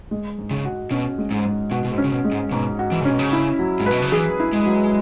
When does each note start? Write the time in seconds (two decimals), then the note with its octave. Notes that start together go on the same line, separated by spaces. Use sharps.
0.11 G#3
0.38 G#2
0.51 C#3
0.65 F#4
0.91 B2 C#4
1.18 G#3
1.31 G#2
1.45 G#2
1.71 B2 F#4
1.85 B2
1.92 G#2
1.98 C#4
2.04 C#3
2.12 B2
2.25 G#3
2.32 G#2
2.51 G#2 B2
2.79 F#4
2.92 E3
3.01 C#3
3.05 B2 C#4
3.19 C#3
3.33 E4
3.59 F#3
3.80 G#2
3.86 B2 B4
4.02 C#3
4.12 E3 G#4
4.40 E4
4.53 G#3
4.66 F#3